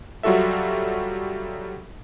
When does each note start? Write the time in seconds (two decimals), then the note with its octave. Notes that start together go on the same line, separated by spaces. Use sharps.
0.23 F#3 G3 F4 F#4 A4 E5